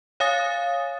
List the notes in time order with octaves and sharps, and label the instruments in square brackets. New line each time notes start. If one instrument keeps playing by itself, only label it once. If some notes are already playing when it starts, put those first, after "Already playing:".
[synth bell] C#5 F5 G#5 D#6 A6